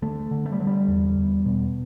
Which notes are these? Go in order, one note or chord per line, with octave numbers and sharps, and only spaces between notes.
D3 A3
D3
A3
G3
D3 F#3
G3
E2
E2
B2